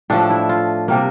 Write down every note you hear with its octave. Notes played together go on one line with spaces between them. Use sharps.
A2 F3 A3 D4
E4
F4
C3 G3 A#3